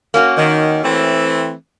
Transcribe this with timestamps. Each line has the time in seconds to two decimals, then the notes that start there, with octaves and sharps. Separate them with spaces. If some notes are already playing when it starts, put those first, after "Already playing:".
0.14 A#3 C#4 F#4
0.37 D#3
0.84 E3 A3 C4